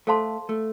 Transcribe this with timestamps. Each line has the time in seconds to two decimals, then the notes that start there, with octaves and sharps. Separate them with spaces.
0.07 A3 A4 C5 F5 A5 C6
0.49 A3